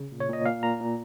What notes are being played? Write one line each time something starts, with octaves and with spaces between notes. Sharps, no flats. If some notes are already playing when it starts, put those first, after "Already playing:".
Already playing: C#3
A#2
C#5
A#2 D#5
A#2 F5
A#2 A#5
A#2